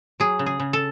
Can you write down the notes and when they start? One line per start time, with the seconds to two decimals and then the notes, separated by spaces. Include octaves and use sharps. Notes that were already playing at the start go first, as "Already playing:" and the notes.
0.20 F#3 G#4
0.39 C#3
0.46 G#4
0.60 C#3
0.73 A4